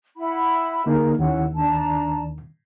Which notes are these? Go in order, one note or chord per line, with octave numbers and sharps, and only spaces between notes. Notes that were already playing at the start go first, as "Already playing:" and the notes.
E4 F#5 B5
D3 A#3 D#4 G#4 A#4
D#2 D#3 C#4 E4 F#5
D4 A5 A#5